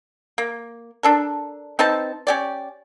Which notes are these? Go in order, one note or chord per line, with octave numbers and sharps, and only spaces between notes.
A#3
D4 A4 A#4
C4 D#4 B4 A5
C#4 G4 D5